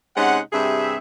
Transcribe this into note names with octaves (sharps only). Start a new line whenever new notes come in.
C3 G#3 C#4 D#4 F#5
G2 C3 G#4 E5